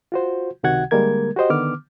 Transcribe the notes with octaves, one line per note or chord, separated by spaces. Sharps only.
F4 F#4 C5
C#2 C3 D#3 F#4 F#5 G#6
D3 G3 G#3 A#3 A#4 G#6
F#4 G4 C5 D#5
D3 D#3 B3 D6 F6